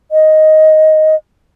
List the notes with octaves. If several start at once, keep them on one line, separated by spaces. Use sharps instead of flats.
D#5